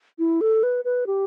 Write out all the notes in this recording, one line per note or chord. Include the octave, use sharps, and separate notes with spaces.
E4
A4
B4
B4
G4